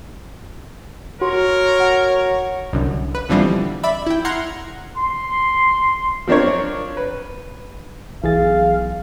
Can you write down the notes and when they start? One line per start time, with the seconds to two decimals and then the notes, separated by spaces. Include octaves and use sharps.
1.21 F#4 A#4 C#5 C6
1.80 F#5
2.73 C2 F#2 D3
3.15 B4
3.29 B2 D3 E3 F3 G3 C4
3.83 D5 E5 B5
4.06 E4 G5
4.25 F#5 A#5 C6 F6 G#6
4.97 C6
6.27 F3 C4 D4 A#4 C#5
6.97 B4
8.24 B1 E3 G#4 F5 A6